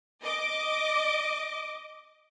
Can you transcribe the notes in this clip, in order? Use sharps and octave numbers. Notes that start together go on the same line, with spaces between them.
D#5 D6